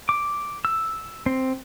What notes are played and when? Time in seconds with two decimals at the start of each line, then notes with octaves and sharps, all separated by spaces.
0.09 D6
0.65 E6
1.26 C4